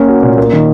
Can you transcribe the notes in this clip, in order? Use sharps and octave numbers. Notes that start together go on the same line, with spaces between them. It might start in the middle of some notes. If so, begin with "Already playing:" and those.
Already playing: A#3 C#4
F#4
A#2
A#3
D#3